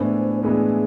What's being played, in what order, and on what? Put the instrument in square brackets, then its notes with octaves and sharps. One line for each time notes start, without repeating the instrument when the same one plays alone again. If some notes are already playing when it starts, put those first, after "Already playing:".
Already playing: [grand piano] A2 E3 G#3 B3 D4 [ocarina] C5
[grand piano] A2 E3 G#3 B3 D4 [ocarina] G#4